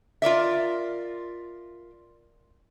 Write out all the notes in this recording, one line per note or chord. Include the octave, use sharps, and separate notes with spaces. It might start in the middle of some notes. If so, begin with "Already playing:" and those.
F4 A#4 D5 E5